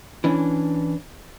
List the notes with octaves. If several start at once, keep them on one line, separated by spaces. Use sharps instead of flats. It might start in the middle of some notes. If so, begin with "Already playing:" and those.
E3 C#4 D4